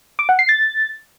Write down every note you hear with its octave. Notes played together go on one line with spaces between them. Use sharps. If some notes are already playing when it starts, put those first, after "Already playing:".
D6
F#5
C7
A6